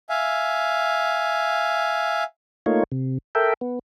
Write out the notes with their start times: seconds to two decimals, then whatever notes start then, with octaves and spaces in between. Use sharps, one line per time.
0.09 E5 F5 G#5
2.66 A3 A#3 D#4 F4 C#5
2.92 C3
3.35 A4 A#4 E5 G5
3.61 B3